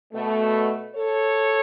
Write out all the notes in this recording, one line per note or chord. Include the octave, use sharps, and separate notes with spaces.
B2 A3
A4 C#5